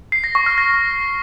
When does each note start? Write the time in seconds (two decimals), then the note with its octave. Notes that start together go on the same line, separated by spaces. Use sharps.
0.12 C7
0.24 A#6
0.35 C#6
0.46 F6
0.58 A#6